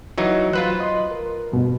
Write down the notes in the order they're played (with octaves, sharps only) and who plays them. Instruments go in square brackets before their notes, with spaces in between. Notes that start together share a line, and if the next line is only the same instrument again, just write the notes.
[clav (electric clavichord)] E3 F#3 D#4
[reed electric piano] F#3 F#6 [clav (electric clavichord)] F4 B4 C5
[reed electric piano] D#5 C6
A#4
G2 B2 F3